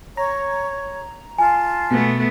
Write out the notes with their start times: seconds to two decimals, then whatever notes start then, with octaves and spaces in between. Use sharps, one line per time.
0.17 C#5 A#5
1.38 F4 G#5 A5
1.91 B2 A3 B3